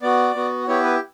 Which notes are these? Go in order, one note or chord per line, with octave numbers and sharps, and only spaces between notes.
B3 F#4 D5
B3 F#4
B3 E4 G4 C#5
B4